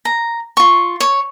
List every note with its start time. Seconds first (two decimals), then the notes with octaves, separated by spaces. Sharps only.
0.05 A#5
0.57 F4 C#6
1.00 C#5